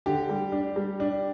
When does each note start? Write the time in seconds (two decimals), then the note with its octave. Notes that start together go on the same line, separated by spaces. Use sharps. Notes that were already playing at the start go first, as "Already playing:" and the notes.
0.06 D3 G4
0.29 G3
0.52 D4
0.76 G3
1.00 D4